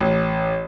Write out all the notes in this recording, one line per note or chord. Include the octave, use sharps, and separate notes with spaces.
A1